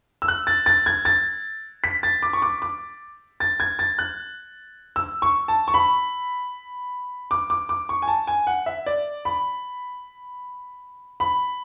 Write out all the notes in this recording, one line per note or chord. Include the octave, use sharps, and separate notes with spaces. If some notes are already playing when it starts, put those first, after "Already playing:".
E6
F#6
A6
A6
G#6
A6
B6
A6
D6
C#6
D6
D6
A6
G#6
A6
F#6
E6
C#6
A5
C#6
B5
D6
D6
D6
C#6
G#5
A5
G#5
F#5
E5
D5
B5
B5